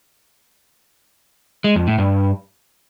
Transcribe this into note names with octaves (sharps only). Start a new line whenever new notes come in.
G#3
F2
A2
G2